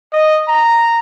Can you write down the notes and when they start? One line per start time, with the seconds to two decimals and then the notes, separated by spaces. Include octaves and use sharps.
0.13 D#5
0.48 A#5